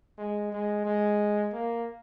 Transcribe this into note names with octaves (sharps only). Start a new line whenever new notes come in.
G#3
G#3
G#3
A#3